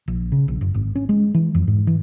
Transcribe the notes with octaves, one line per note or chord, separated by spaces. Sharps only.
A#1
C#3
A#1
F#1
G#1
C#4
G#3
E3
F2
G#2
E3